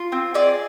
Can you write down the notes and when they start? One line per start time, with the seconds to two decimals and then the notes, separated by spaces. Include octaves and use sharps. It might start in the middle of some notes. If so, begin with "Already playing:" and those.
Already playing: F4
0.12 C4
0.34 G#4 D5